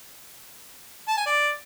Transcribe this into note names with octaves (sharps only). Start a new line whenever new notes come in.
A5
G#5
D5